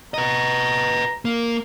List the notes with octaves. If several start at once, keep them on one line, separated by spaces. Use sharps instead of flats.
B4 D#5 A#5
A#3